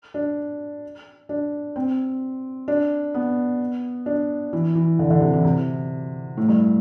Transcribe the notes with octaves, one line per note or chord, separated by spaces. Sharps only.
D4
D4
C4
D4
B3
D4
E3
E3
D3
D3
C3
E3
C3
A2
G2